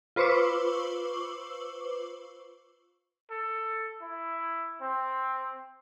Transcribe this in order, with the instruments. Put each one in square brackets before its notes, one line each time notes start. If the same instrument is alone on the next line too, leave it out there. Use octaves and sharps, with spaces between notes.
[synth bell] F4 B4 C5 C#6 D6 E6
[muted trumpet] A4
E4
C4